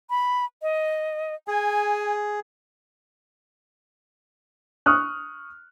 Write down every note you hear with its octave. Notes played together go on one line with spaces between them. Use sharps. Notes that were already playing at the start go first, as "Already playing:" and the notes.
B5
D#5
G#4 G#5
C#6 D#6 F6 F#6